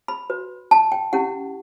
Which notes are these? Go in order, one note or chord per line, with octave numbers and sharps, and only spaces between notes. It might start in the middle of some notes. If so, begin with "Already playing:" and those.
B5
F#4 B4
A5
G5
C#4 E4 G4 F#5